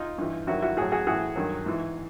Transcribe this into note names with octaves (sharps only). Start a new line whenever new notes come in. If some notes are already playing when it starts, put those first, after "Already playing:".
Already playing: D#4 F4
G2 E3
G2 D#3 F#3 E4 F#4
E4 F#4
A2 F#3 F#4 G#4
F#4 G#4
A2 E3 F#4 G#4
G2 D#3 F#3
G#2 E3